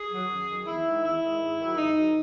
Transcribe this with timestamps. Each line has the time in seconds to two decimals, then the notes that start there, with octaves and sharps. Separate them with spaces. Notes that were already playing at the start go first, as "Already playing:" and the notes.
Already playing: G#4
0.11 D#3 F#3
0.29 F#2
0.48 D#3
0.53 F#3
0.66 E2 E4
0.85 D#3 G#3
1.03 E2 E4
1.22 D#3 G#3
1.40 G#2
1.58 D#3 F#3
1.76 G#2 D#4
1.94 D#3 F#3